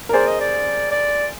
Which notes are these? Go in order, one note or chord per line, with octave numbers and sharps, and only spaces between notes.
A#4
G#4 C5 D5
D#5
D5
D5